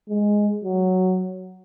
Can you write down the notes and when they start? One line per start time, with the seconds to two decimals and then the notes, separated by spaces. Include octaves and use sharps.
0.08 G#3
0.65 F#3